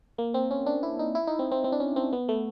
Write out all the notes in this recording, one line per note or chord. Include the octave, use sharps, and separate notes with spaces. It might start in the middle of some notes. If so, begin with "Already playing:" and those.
A#3
C4
C#4
D4
E4
D#4
E4
D#4
C4
C4
C4
D4
C#4
C4
B3
A3